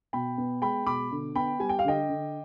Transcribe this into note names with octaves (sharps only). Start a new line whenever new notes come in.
B2 G5 B5
B3
G#3 G5 B5
B2 B5 D6
D3
B3 G5 B5
G3 G#5
G5
F5
D3 D#5 G5
D3